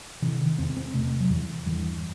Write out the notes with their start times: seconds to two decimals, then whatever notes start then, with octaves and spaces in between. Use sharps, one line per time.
0.22 C3 E3
0.41 D#3
0.58 E2 C4
0.77 C4
0.94 C3 A3
1.20 F#3
1.30 E2 E3
1.66 G2 E3